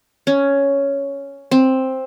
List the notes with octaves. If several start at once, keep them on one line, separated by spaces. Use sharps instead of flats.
C#4
C4